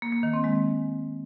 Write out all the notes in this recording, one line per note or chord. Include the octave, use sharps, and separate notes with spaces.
A#3
A#3
D#3
C4
G#3